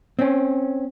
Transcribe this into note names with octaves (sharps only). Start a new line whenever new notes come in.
C4 C#4